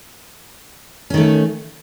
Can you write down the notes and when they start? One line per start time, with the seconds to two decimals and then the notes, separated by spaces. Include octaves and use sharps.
1.10 C#4
1.14 D#3
1.17 A3